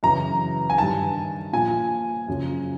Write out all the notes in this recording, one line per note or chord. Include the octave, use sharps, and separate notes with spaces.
F#2 C#3 E3 A#5
G#5
G2 D#3 A5
A#2 F3 G#5
F#2 C#3 F3